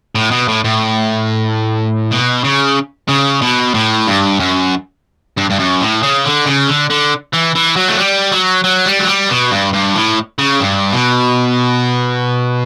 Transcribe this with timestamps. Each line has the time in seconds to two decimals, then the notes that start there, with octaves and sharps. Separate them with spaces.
0.15 A2
0.31 B2
0.48 A2
0.64 A2
2.11 B2
2.44 C#3
3.09 C#3
3.42 B2
3.74 A2
4.07 G2
4.40 F#2
5.38 G2
5.51 G2
5.60 F#2
5.81 A2
6.03 C#3
6.25 D3
6.46 C#3
6.68 D3
6.90 D3
7.34 E3
7.56 E3
7.77 F#3
7.89 A3
7.99 G3
8.32 F#3
8.64 F#3
8.86 G3
9.00 F#3
9.07 G3
9.29 B2
9.51 G2
9.73 G2
9.95 A2
10.39 C#3
10.60 G2
10.93 B2